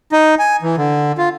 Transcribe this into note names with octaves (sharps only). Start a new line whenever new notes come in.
D#4
G#5
E3
D3
F4